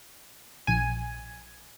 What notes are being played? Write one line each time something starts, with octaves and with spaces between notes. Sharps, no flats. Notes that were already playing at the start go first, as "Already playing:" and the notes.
A#1 G#5